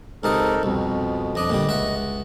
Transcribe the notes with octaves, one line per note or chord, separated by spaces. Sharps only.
C#2 C3 D#4 A4 A#4 D#5
C2 F2 B2
F2 D4 D#5 D#6
A#2 D3 G3
C#2 E5 F#5